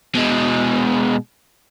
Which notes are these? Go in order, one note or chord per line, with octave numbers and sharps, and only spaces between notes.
B2 G#3